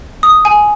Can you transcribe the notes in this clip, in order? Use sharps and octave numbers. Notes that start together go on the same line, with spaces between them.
D#6
G#5